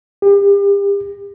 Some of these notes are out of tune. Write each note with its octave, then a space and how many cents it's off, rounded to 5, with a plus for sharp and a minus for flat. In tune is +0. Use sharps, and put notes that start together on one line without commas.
G4 +35